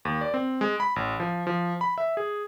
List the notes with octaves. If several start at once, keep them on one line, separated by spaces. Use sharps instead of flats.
D#2
D5
C4
G#3
B5
A1
F3
F3
B5
E5
G#4